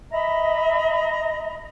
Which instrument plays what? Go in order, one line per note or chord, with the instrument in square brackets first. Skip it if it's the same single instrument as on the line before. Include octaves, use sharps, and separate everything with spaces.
[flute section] D#5 E5 A#5 B5